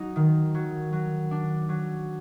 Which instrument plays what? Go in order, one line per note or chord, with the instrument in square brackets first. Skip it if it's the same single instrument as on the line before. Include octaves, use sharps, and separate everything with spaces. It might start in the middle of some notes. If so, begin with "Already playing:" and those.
Already playing: [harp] F#3 D#4
D#3
F#3
F#3
D4
F#3